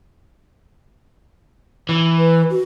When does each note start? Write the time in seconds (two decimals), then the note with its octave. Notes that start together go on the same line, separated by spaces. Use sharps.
1.89 E3
2.17 B4
2.50 F#4